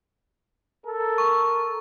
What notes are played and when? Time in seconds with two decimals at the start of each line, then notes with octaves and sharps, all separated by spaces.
0.85 A4 A#4
1.18 C#6